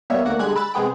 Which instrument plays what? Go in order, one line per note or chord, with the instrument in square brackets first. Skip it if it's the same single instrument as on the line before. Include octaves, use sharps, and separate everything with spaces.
[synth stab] G3 A#3 B3 C#5 E5
D2 A#3 F#4 F#5 D7
D3 G3 G#3 F#6 G#6 B6
B5 E6 F#6 A6
C3 G#3 B3 G#4 G5 D7